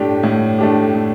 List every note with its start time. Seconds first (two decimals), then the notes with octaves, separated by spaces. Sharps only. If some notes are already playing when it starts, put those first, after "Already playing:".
Already playing: A2 A3 D4 G4
0.23 A2
0.59 A3 D4 G4
0.95 A2